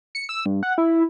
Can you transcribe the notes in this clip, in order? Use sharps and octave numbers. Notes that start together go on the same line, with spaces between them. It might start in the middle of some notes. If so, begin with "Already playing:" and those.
C#7
E6
G2
F#5
E4